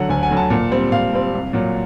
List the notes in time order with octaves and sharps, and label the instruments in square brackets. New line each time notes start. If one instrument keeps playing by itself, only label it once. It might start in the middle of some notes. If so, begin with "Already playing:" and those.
Already playing: [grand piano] D3 F#3 F#5
D2 G#5
G#5
D3 F#3
A5
A#2
G3 C4
A#2 F5
G3 C4
C2
A#2 F#3